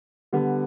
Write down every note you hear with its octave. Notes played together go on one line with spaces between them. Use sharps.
D3 G3 B3